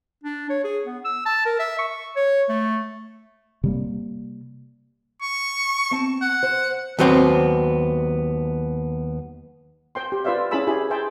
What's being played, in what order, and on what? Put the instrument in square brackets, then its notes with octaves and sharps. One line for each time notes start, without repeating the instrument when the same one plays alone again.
[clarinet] D4
C#5
G#4
B3
E6
A5
A#4
E5
C#6
C#5
A3
[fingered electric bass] C3 G3 A#3
[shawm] C#6
[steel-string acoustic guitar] C4 A5
[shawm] F#5
[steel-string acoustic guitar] C5
[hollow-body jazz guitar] D#2 F#3 B3 C4
[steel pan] C5 G5 C6
G4
F4 B4 C5 D5 E5 F5
C#4 E4 G#4 A5 B5 E6
E4 G4 G#4 B5
G#4 C5 E5 G5 A5